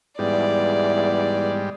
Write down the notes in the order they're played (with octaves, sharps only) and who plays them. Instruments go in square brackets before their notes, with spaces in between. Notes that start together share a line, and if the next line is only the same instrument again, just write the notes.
[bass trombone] E2 [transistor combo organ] G#2 G3 [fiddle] D5